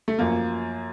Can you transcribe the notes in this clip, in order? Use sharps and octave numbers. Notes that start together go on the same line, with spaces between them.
A3
F#2 F3 A#3